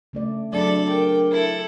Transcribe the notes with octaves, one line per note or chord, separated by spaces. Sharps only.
C#3 A3 D5
F#3 C4 D4 G#4 A4 D5 B5 D6
A#4 G5
E4 A4